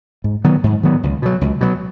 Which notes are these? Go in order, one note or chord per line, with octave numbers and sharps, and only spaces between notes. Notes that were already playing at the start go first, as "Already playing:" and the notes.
G#2
D#3 F#3 B3
G#2
D#3 F#3 B3
C#2
B2 F#3
C#2
B2 F#3